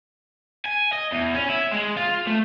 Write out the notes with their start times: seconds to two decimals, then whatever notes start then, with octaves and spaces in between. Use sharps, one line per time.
0.66 G#5
0.93 D#5
1.13 E2
1.35 C#4
1.50 E4
1.73 G#3
1.97 F4
2.27 A3